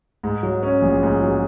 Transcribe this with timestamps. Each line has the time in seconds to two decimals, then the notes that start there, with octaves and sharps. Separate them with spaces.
0.23 G#2
0.43 F#3
0.63 C#4
0.82 A#1
1.03 G#2
1.22 F#3